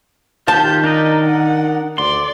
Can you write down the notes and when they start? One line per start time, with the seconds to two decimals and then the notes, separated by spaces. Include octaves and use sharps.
0.48 D#3 F4 G4 A5 G6
0.84 D4 D#4 A#4 D#5
1.26 F#5
1.98 D2 D5 C6